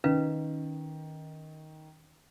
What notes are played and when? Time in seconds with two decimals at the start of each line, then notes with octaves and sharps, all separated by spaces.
0.04 D#3 C#4 B4 F5